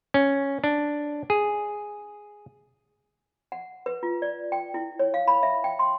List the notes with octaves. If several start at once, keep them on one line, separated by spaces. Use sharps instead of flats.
C#4
D4
G#4
F#5
B4
F4
D5
G5
E4
C#5
F5
B5
E5
G5
C6